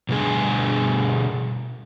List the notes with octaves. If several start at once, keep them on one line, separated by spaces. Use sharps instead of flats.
B2 D3 G3 G#4 G#5